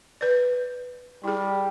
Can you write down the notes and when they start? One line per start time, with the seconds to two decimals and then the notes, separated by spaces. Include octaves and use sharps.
0.21 B4 D5
1.24 G3 E4 G#4